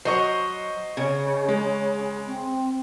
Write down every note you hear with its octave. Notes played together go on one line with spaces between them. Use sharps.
F#3 C5 D#5 C#6
C#3 C#5
G#3
C4